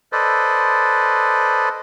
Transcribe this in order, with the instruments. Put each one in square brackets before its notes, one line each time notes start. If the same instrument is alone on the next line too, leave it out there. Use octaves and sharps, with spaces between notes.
[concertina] A4 B4 C5 D5 D#5